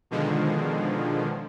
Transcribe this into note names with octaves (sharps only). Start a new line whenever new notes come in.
B2 D3 D#3 F3 G#3